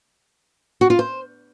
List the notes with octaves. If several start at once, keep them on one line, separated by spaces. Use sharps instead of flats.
F#4
F4
C5